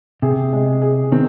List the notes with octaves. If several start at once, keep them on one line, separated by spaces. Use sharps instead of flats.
C3 G#4
G#3
G#4
D#3 C4